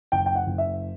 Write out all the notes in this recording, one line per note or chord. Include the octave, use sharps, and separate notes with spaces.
F#1 G5
G5
F#5
F#1
E5